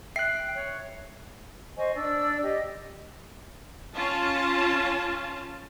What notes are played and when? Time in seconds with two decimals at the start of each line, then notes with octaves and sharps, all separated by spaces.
0.16 E5 G5 F#6 C7
0.55 C#5
1.78 C5 D#5 G#5 C#6
1.95 D4 D5 E6
2.43 G4 D#5
3.95 C#4 F4 A5